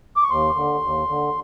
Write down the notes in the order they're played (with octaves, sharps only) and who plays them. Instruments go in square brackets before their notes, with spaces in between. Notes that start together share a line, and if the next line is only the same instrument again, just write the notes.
[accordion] D6
C#6
D#2 C6
D3
D#2
D3